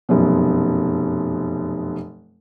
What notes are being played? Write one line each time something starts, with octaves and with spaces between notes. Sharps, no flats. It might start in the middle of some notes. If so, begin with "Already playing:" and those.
F1 F#2 B2